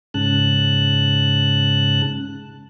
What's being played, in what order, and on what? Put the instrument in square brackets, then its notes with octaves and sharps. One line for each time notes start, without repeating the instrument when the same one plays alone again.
[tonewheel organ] G#2 C#3 A5 F#6